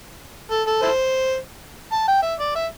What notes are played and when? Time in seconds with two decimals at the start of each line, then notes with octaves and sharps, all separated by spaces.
0.51 A4
0.67 A4
0.82 E4 A4 C5
1.92 A5
2.08 G5
2.23 E5
2.40 D5
2.56 E5